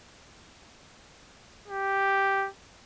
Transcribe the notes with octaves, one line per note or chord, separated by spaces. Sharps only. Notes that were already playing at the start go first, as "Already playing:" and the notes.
G4